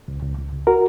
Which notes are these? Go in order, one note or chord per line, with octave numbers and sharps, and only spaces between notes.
C#2
C#2
C#2
C#2
F#4 A#4